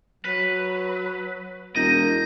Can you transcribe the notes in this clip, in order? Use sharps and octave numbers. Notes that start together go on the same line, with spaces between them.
F#3 B4
E1 A#3 D#5 G6 A#6